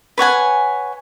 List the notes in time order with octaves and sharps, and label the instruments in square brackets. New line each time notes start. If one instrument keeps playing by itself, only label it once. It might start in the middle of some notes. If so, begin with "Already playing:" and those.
[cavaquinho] B4 C#5 F#5 G#5